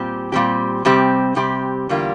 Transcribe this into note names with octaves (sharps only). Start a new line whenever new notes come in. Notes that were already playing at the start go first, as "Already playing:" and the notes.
Already playing: A#2 G3 C4 G4
A#2 G3 C4 G4
C3 G3 C4 G4
C3 G3 C4 G4
E2 D3 G3 A#3 F4